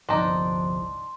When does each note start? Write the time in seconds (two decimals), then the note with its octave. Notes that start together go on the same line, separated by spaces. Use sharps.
0.09 G1 C2 F3 D4 D#4 C6